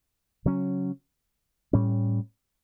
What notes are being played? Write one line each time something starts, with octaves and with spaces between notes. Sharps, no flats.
C#3 F#3 C#4
A2 G3 C#4